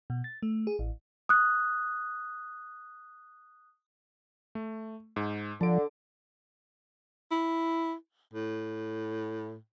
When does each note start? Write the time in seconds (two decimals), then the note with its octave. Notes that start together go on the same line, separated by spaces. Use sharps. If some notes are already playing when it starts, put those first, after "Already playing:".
0.10 B2
0.24 A6
0.42 A3
0.67 G#4
0.79 A1
1.29 D#6 F#6
4.55 A3
5.16 G#2
5.61 D3 F3 A5 D7
7.31 E4
8.34 A2